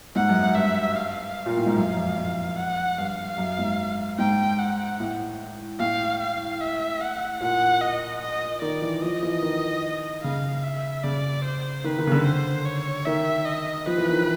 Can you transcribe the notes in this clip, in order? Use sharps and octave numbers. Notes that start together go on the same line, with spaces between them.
G#2 F#5
F#2
F#2
G2 E5
F5
A#2
A2
G#2
F#2 F5
F2
F2
F#5
G2 F5
F#2
G#2
G#2 G5
F#5
A2
A2 F5
F5
E5
F#5
A#2 F#5
D#5
D#5
D#3 D5
E3
F3 D#5
E3
D#3
C#3 F5
E5
C#3 D5
C5
D#3 B4
D#3
C#3
D3
C5
C#5
D#3 E5
D#5
F3 B4
E3
D#3
E3